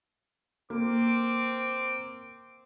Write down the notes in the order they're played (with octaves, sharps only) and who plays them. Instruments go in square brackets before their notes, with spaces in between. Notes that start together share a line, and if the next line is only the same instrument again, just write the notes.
[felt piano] A#3 [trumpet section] C4 D6